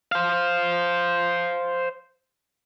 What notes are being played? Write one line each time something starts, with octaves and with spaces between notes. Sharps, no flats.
C5 F5